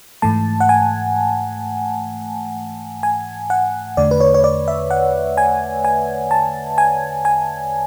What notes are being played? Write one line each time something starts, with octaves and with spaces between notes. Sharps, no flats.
G#2 E3 A3 A5
F#5
G#5
G#5
F#5
E2 D3 A3 D5
B4
C#5
C#5
D5
E5
F#5
G#5
G#5
A5
G#5
G#5